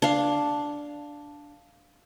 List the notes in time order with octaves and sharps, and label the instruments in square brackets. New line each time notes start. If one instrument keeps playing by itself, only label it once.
[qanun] D4 F5